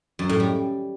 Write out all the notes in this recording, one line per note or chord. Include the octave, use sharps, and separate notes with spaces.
F#2
A2
G3